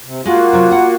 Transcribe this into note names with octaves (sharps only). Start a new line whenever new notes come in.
C3
G#3 A#3 F4 F#4
C3 F#3
F#5